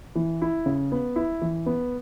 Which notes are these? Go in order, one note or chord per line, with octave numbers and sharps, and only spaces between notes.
E3
E4
C#3
B3
E4
E3
B3